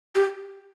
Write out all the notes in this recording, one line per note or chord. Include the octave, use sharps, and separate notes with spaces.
G4